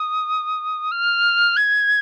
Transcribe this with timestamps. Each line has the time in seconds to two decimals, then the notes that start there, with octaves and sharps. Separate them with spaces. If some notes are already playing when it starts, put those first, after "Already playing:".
Already playing: D#6
0.91 F6
1.57 G#6